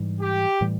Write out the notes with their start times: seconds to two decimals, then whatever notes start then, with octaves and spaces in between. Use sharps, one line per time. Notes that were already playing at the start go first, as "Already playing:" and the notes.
Already playing: G#2 E3 G3
0.21 G4
0.61 A2 E3 G3